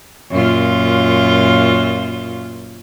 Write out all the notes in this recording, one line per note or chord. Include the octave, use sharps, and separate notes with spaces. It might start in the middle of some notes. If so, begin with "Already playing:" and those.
F#2 A#2 F4